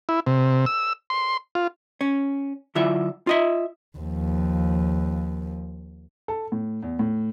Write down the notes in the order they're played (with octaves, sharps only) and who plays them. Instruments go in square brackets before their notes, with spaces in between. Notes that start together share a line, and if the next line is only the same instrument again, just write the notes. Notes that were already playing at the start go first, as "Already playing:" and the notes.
[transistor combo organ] E4
C3
E6
C6
F4
[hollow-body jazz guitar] C#4
D3 F#3 E4 F4 E5
F4 D#5 E5
[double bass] D#2 F3
[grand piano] A4
A2
E2
A2